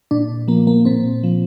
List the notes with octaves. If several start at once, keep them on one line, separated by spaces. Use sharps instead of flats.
A#2 D4
F3 A#3
A#3
A#2 C4
F3